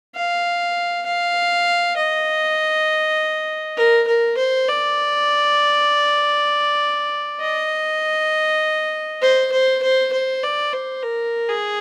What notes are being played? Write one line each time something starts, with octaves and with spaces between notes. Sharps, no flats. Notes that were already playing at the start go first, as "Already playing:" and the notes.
F5
F5
D#5
A#4
A#4
C5
D5
D#5
C5
C5
C5
C5
D5
C5
A#4
G#4